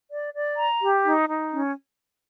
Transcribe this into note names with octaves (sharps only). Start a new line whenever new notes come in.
D5
D5
A#5
G4
D#4
D#4
C#4